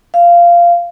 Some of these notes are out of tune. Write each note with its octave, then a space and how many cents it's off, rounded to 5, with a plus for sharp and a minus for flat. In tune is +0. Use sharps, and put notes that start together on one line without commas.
F5 -15